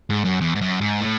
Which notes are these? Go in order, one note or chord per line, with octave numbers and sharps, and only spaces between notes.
G#2
F#2
E2
G#2
F#2
G#2
A2